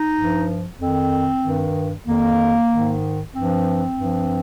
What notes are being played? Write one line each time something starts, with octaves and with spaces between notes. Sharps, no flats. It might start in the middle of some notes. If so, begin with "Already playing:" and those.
Already playing: D#4
G2 F3
F2 D#3 C4
G2 D#3
F2 D#3 A#3
G#2 D#3
G2 F3 C4
G2 F3